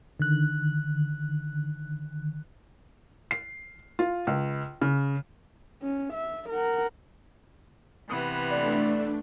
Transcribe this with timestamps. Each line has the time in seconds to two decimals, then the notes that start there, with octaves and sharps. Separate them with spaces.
0.20 D3 D#3 F#6
3.31 C7
3.99 F4
4.27 C#2
4.81 C#3
5.83 C#4
6.14 E5
6.49 A#4 F#5
8.06 C3 E3 B3
8.50 A3 D4 D5